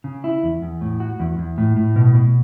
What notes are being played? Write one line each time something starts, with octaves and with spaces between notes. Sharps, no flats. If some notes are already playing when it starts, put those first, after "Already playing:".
C#3
E4
E2
E2
A2
F#4
E2
E2
A2
A2
B2
B2